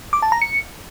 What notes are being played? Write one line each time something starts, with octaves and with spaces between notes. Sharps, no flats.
D6
A5
A#5
C#7